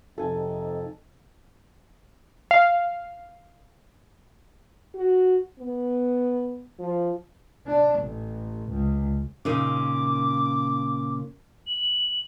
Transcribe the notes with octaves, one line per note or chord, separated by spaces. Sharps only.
F2 C3 D#4 A4 G#5
F5
F#4
B3
F3
D4
A1
C#2
A#2 C#3 D#4 D6
F#7